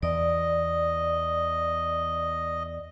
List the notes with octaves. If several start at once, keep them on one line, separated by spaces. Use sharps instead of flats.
E2 E3 D5 D#5